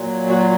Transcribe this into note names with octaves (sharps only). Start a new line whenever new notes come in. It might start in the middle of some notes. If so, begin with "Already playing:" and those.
Already playing: A#2 F#3
F#4